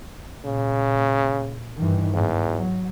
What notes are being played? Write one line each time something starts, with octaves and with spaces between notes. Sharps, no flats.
A#2 C#3
G2 D#3 E3
E2 G#2
F#3